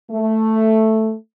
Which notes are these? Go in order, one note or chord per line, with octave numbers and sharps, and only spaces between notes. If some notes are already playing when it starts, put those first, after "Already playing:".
A3